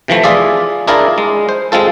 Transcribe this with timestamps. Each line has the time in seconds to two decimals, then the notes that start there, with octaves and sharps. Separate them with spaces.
0.08 C3 E3 F3 A3
0.24 F4 G#4 D5 E5
0.87 D4 E4 F4 G#4 A#4 D5
1.18 G#3
1.49 C5
1.72 G#3 C4 F4 A4